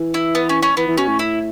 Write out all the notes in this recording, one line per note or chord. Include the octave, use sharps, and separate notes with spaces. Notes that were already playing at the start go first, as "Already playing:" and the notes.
Already playing: E3
E4
B3
C#4
C#4
E3 B3
E3
B2 C#4
A2
E4